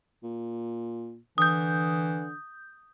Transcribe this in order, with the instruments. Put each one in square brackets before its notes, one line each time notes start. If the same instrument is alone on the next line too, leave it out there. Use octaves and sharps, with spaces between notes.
[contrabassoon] A#2
[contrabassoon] D3 [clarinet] E3 [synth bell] D#6 G6